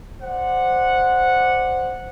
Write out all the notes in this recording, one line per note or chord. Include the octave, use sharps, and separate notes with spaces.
C5 D5 F#5